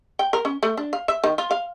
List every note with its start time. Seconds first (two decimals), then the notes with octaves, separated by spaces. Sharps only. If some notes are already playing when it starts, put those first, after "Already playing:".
0.19 G5
0.33 A#4
0.45 C#4
0.63 A3
0.77 D4
0.93 F5
1.08 E5
1.24 D#3
1.38 F4
1.51 F5